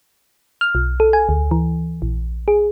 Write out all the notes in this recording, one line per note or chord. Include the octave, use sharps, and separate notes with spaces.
F6
B1
A4
G#5
D2
E3
A#1
G#4